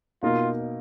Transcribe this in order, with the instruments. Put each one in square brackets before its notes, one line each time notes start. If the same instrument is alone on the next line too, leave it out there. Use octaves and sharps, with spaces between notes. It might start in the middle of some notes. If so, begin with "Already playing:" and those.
[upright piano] B2 A#3 D#4 A#4 [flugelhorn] F4